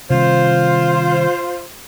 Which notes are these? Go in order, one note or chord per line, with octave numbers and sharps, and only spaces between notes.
C3 D#3 G3 F4 C5